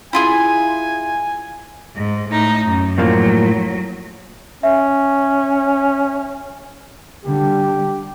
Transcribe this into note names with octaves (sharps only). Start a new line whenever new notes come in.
E4 F4 G#4 G#5
G#2
A2 D#4
F#2
A2 F3 F#3 A#3
C#4 E5
D3 G3 G4